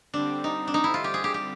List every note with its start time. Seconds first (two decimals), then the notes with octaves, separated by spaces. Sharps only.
0.14 D3 G3 C4 D4
0.44 D#4
0.67 D4
0.74 D#4
0.84 E4
0.94 F4
1.04 G4
1.14 G#4
1.24 G4
1.34 G4